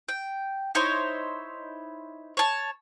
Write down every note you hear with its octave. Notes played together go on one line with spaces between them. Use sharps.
G5
D#4 E4 C5 C#5
C#5 A5